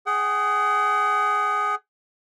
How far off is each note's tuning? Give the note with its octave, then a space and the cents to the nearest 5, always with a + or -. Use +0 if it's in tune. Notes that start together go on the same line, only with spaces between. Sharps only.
G#4 +0 F#5 +40